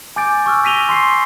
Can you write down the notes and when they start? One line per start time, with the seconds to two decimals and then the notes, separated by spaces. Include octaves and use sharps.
0.16 G#5 D6 G6 A6 D7
0.46 C#6 E6 F6
0.63 C#6 A#6 B6 D#7 F7 G7
0.89 C6 C#6 C7